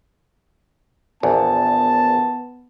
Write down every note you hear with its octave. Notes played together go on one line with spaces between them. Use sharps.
A#1 E2 B3 A5